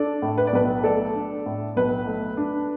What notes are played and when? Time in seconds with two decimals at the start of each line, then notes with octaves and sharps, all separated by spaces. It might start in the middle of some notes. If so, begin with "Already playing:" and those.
Already playing: D4 A4 D5
0.22 A2
0.38 B4
0.47 D5
0.53 B1 B4
0.84 A3 A4 D5
1.15 D4
1.46 A2
1.76 B1 B4
2.07 A3
2.37 D4